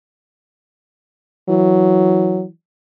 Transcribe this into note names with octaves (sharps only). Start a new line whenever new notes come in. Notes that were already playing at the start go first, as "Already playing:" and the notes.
E3 F#3